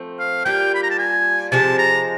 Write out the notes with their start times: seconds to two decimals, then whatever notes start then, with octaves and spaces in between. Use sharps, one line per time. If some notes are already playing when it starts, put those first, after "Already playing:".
Already playing: F3 A3 C4
0.19 F5
0.45 G3 A#3 D4 F4 G5
0.75 B5
0.83 A#5
0.90 A5
0.98 G#5
1.52 C3 F3 G#3 A5
1.78 A#5